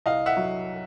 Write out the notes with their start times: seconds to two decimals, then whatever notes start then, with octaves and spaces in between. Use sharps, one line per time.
0.06 C2 D#5 F5
0.26 E5 F#5
0.37 F#3